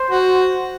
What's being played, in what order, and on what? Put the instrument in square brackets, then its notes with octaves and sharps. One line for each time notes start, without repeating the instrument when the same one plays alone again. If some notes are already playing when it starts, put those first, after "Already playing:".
Already playing: [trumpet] C5
[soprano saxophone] F#4